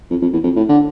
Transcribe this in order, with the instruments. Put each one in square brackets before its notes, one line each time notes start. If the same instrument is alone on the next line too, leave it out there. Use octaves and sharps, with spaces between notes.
[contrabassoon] F2
F2
E2
F2
A2
D3